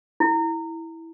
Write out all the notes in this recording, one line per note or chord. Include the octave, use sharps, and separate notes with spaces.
E4